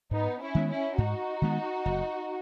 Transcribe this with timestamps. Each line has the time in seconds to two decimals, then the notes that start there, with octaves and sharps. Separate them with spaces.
0.11 G#2 B3 D#4
0.40 C#4 E4
0.55 D#3 G#3 B3
0.69 C#4 E4
0.98 G#2 D#4 F#4
1.42 D#3 G#3 B3
1.85 F#1